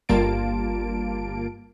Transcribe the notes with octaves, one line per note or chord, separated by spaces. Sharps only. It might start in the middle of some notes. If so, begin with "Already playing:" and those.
G1 G3 A#3 F4 A5 D7